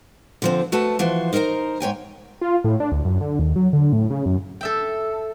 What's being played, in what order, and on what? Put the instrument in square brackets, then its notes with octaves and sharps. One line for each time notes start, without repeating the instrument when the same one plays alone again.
[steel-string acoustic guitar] D3 F3 C4
A3 F#4 A4 B4 A5
E3 F3 F#4 C5
D#4 A#4 C5 F5 A#5
G#2 C#5 G5 G#5
[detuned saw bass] F4
A2
D4
D2
F#2
D3
D#2
F#3
D3
A2
C#3
F#2
[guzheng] A4 E5 G5